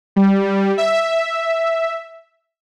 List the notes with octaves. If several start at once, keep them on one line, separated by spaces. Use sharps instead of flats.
G3
E5